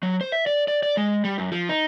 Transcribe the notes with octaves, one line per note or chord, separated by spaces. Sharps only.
F#3
C5
E5
D5
D5
D5
G#3
G3
F#2
F3
D#4